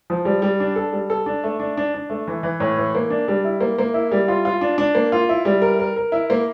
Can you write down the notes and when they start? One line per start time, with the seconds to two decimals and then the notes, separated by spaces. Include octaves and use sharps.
0.10 F3
0.25 G3
0.42 G3
0.60 D4
0.76 A4
0.93 G3
1.10 A4
1.26 D4
1.44 A3
1.59 D4
1.77 D4
1.94 D4
2.10 A3
2.27 E3
2.43 E3
2.60 A2
2.77 E3
2.95 A#3
3.10 D4
3.28 G3
3.45 E4
3.60 A#3
3.78 A#3
3.94 E4
4.12 G3
4.28 F4
4.45 F4
4.61 D4
4.78 D4
4.95 A#3
5.12 F4
5.29 E4
5.45 G3
5.62 A#4
5.80 A#4
5.96 A#4
6.12 E4
6.30 A#3